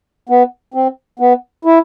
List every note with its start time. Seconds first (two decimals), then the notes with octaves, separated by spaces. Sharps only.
0.29 B3
0.74 C4
1.20 B3
1.65 E4